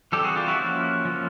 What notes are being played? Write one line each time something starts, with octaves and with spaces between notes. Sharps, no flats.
E3 G3 C4 G4 A4
F#4 G#4
F4 G4
E4 F#4
F3 A#3 C#4
F3 A#3 C#4